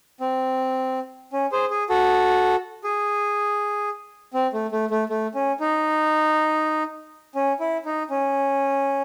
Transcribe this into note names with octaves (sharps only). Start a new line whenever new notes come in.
C4
C#4
G#4 C5
G#4
F#4 A4
G#4
C4
A3
A3
A3
A3
C#4
D#4
C#4
E4
D#4
C#4